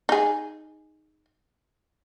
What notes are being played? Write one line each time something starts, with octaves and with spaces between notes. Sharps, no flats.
D#4 G#4